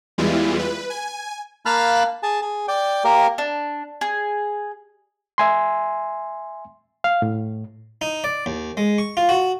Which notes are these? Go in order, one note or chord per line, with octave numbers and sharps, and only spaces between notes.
E2 E3 G3 G#3 E4 F4
B4
G#5
A#3 F5 A5 B5 F6 F#6
G#4 A5
G#4
D5 G5
A#3 G4 A#4
D4
G#4
E5 G#5 C6
F5
A2
D#4
D5
D#2
G#3
C#6
F4
F#4